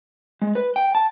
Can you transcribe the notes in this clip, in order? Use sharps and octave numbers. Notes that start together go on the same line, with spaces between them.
G#3
B4
G5
A5